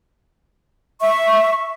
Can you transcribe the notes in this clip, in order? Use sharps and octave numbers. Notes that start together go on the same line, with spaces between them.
E5 C#6